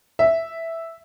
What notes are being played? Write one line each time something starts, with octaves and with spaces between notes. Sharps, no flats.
E5